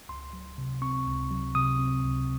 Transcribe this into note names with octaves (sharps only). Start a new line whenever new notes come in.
C#2 C6
F#3
C3
C4 C#6
C#2
F#3
C3 D#6
C4
C#2